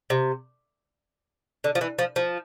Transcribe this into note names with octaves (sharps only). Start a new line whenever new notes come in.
C3
D3
F3
E3
F3
F3